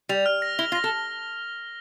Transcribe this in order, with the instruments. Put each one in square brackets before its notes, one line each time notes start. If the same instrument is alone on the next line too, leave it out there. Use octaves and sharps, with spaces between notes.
[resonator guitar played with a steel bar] G3 [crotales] F7
[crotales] F6
A#6
[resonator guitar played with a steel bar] E4 [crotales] G7
[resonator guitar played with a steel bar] F4
[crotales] A#6
[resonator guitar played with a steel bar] A4